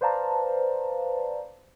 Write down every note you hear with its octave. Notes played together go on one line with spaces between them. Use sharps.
B4 C5 D5 F5 A5 A#5